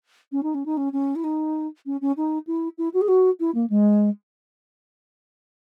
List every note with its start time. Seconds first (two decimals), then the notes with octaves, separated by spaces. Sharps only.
0.32 C#4
0.43 D#4
0.54 C#4
0.66 D#4
0.77 C#4
0.93 C#4
1.16 E4
1.24 D#4
1.86 C#4
2.01 C#4
2.17 D#4
2.47 E4
2.78 E4
2.94 F#4
3.01 G#4
3.08 F#4
3.40 E4
3.55 A#3
3.70 G#3